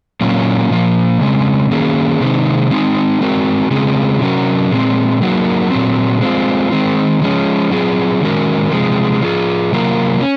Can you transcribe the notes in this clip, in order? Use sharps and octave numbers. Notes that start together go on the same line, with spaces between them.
A#2 F#3 A#3 C#4 F4
A#2 F3 A#3
C#3 G#3 C4
D#3 F#3 A#3 C#4 G#4
C3 D#3 G#3 C4 D#4
G#3 C4 D#4
G#3 C4 F#4 A#4
C#3 G#3 C4 F4 G#4
C3 F#3 C#4 F#4 A#4
A#2 G#3 C4
F#3 A#3 D#4 F#4 A#4
A#2 F#3 C4
G#3 C4 F4
D#3 G#3 C4
F3 G#3 C#4
F#3 C4 F4 G#4
D#3 G#3 C#4 F#4 A#4
C3 F3 G#3
F3 C4 F4 G#4
C3 F#3 A#3 F4 A#4
C#4